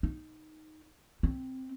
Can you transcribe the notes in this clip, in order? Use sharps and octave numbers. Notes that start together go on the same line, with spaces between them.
D#4
C4